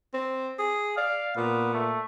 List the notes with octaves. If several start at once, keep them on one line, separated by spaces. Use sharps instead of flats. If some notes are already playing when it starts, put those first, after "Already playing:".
C4
G#4
D5 F5
A#2 B3
A3